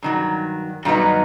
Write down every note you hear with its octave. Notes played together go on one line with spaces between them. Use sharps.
G2 D#3 F#3
G2 D#3 F#3 B3 D#4